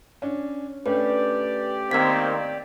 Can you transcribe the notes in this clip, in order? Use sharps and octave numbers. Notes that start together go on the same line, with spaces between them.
C#4 D4
A3 C#4 D4 G4 B4 D5
D#3 A#3 C4 E6 G#6 B6